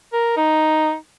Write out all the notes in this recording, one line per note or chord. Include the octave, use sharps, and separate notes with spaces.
A#4
D#4